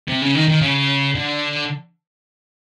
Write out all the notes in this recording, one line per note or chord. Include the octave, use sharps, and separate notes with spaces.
C3
C#3
D#3
D#3
C#3
D3